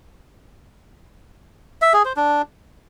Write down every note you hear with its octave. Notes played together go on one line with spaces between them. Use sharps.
E5
G#4
C5
D4